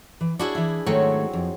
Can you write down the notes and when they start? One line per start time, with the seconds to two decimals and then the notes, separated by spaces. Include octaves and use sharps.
0.21 E3
0.39 D4 E4 F#4 G#4
0.55 E3 E5
0.86 G#2 D#3 F#3 A3 C4 C#5
1.33 F2